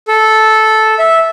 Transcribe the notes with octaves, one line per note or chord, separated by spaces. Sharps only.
A4
E5